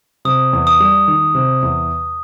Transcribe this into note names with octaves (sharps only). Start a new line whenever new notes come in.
C3 D#6
E2
D#6
G3
D#3
C3
E2